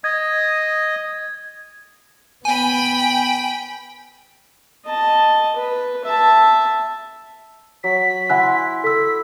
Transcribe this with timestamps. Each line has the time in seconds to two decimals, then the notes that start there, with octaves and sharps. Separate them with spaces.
0.04 D#5 D#6 G#6
2.45 B3 G5 G#5 B5
4.85 D#5 A5
5.56 B4
6.04 E5 A5
7.84 F#3 B6
8.30 E4 F#5 G#5 C6 F#6
8.84 A4 E6 B6